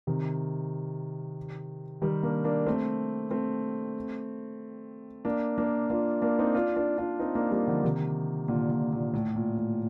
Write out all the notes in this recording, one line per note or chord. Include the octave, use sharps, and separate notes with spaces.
C3 D#3
D#3 G3
A#3 D4
A#3 D4
A3 C4
A3 C4
A#3 D4
A#3 D4
D4 F4
A#3 D4
C4 D#4
D4 F4
D4 F4
D4 F4
C4 D#4
A#3 D4
G3 A#3
D3 F3
C3 D#3
A#2 D3
A#2
A#2
A2
A#2
A2